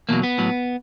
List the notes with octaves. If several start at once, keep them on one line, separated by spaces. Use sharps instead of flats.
E2 B2 F#3 A#3
B3
A2 F#3